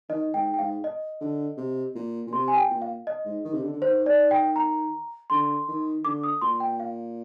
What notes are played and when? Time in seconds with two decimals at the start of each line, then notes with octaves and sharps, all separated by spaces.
0.09 D#3 D#5
0.34 G#2 G5
0.54 G5
0.59 G#2 F5
0.84 D#5
1.20 D3
1.57 C3
1.95 A#2
2.27 A#2
2.33 C3 C6
2.48 G#5
2.57 G5
2.70 A#2
2.82 F5
3.07 D#5
3.25 G#2
3.45 D#3
3.53 C3
3.62 D3
3.73 D3
3.82 D#3 C5
4.06 D5
4.31 G5
4.56 A#5
5.30 D3 C6
5.68 D#3
6.05 D3 D6
6.24 D#6
6.41 A#2 C6
6.60 G5
6.80 F5